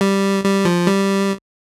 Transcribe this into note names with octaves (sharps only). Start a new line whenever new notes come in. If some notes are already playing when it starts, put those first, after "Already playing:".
G3
G3
F3
G3